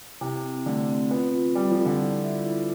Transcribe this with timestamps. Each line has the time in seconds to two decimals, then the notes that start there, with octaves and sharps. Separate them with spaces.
0.21 C3 E4
0.44 C4
0.66 D3 A3
0.89 C4
1.11 B3 F4
1.34 F4
1.55 G3 F4
1.71 F3
1.79 A4
1.86 D3
2.00 E4
2.23 E5
2.45 E4